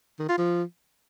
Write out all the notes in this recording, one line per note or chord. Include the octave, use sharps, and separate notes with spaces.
D#3
F4
F3